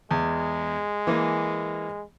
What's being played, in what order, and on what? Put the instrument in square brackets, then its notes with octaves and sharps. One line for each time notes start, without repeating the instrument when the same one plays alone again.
[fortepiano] E2 [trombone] G#3
[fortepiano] E3 A#3